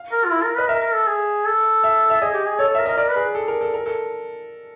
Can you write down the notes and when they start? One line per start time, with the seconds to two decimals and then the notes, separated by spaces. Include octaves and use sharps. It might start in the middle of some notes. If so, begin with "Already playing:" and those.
Already playing: F5
0.12 A#4
0.25 F4
0.31 E4
0.43 A#4
0.56 B4 D#5
0.69 A#4 E5
0.82 A#4
0.94 A4
1.07 G#4
1.45 A4
1.84 E5
2.10 E5
2.22 G#4 D#5
2.34 G4
2.47 G#4
2.59 A4 C#5
2.69 A4
2.75 A#4 E5
2.86 A#4 D#5
2.97 A#4 D5
3.10 B4
3.16 G#4
3.35 A4
3.48 A#4
3.61 A4
3.74 A#4
3.86 A4